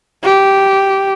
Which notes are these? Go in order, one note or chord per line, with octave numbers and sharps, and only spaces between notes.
G4